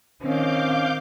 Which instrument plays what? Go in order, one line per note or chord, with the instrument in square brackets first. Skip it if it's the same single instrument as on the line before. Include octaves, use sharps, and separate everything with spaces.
[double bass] D#3 C4 [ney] C#4 [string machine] F5 D6 G6